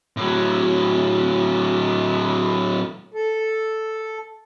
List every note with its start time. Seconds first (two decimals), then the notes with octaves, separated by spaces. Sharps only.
0.17 A2 F#3
3.14 A4